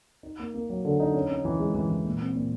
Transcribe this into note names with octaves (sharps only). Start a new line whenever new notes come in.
D#4
A#3
A#3
F#3
D3
D#4
C#4
C#4
E3
G#3
E3
E3
A#2
C4
A#2